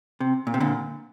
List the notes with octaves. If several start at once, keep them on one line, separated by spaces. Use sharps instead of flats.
C3
A#2
C3
A#2 D3